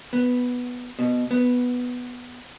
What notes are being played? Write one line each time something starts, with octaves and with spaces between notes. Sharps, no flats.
B3
B2
B3